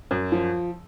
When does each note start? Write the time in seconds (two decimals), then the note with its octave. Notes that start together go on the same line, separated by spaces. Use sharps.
0.11 F#2
0.32 F3